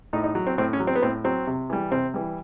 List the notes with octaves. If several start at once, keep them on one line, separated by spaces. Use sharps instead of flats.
A2 D#4
D#4
F#3
C4
A2 C4
C#4
F#3
C4
B3
A2 C4
F#3 C4
C3
E3 G3
C3 C4
E3 G3